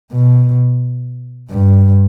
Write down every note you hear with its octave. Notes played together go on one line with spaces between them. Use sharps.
B2
G2